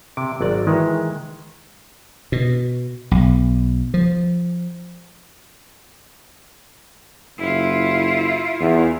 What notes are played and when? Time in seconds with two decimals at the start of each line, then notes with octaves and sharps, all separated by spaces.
0.17 C3 D6
0.41 G#1 F#3 D5
0.67 D#3 E3 G#3
2.32 B2
3.11 B1
3.94 F3
7.38 F#1 E4 F4
8.60 E2